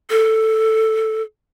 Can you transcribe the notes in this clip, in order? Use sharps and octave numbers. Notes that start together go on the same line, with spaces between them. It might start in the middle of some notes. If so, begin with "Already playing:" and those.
A4